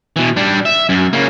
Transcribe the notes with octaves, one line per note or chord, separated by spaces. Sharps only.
B2 E3
G3 D4
E5
F#2
C#3 A#3